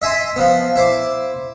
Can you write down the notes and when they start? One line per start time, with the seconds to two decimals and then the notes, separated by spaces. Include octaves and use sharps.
0.02 D#5 E5 G#5 C6
0.36 F3 B3
0.76 E4 C5 D6